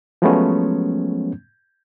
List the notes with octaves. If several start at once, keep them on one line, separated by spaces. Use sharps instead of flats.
F3 F#3 G#3 A3 B3 C#4